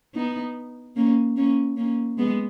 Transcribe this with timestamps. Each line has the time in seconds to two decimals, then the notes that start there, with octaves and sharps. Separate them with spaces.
0.15 B3 D#4
0.96 A#3 C#4
1.36 A#3 C#4
1.77 A#3 C#4
2.18 G#3 B3